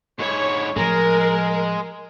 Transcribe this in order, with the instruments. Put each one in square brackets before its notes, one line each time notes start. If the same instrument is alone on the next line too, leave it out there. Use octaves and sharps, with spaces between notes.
[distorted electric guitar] G#2 E4 [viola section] C#5
[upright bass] A2 F3 [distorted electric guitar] G#3 [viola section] A#4